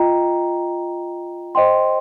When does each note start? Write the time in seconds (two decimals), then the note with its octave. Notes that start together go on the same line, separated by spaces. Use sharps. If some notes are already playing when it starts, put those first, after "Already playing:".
Already playing: F4 D#5 G5 A#5
1.55 C5 D#5 G5 C6